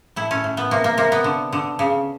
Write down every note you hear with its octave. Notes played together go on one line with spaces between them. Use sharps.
A2 E4
C#4
A2
B3
C3 A#3
A#3
C3 A#3
B3
D3
D3
C#3